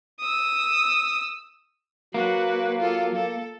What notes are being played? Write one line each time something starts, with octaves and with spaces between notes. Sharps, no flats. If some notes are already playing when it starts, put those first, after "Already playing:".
D#6 E6
F#3 A#3 F#4 B4
F4 A4
A4